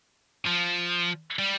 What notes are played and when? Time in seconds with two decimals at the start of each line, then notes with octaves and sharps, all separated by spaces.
0.47 F3
1.39 G3